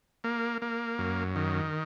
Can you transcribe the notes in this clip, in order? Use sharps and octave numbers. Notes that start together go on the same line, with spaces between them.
A#3
A#3
F#2
D#3